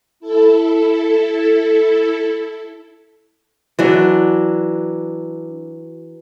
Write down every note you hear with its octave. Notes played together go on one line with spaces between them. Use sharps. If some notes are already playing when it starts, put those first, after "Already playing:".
E4 A4
E3 F#3 D4